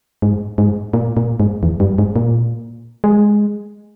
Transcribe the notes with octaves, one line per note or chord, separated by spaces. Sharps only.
G#2
G#2
A#2
A#2
G#2
E2
G2
G#2
A#2
G#3